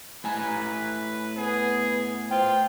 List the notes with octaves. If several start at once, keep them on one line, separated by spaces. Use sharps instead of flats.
A2 B4 G#5 A#5
B3 G#4
F4 C5 G5